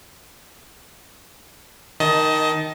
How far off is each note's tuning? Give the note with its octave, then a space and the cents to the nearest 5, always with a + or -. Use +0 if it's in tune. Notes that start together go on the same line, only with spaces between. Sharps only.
D#3 +0 D#5 +20 A5 -10